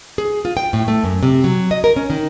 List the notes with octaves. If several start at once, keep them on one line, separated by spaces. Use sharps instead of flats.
G#4
F4
G5
A2
A3
F#2
C3
F#3
D#5
A#4
C#4
D#3